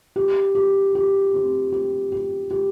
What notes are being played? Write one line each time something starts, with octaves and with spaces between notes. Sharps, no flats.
G4
G4
G4
C4
G4
G4
G4